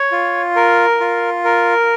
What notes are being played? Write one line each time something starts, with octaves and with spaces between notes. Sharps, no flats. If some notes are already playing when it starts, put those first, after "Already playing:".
Already playing: C#5
F4
A#4
F4
A#4